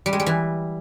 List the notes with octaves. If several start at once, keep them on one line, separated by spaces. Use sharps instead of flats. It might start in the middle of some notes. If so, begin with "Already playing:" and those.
G3
G#3
G3
E3